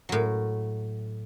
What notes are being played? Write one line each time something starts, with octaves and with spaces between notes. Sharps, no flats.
A2 F#3